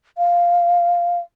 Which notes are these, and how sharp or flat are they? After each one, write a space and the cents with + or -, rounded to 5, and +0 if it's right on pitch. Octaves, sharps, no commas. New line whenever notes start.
F5 -5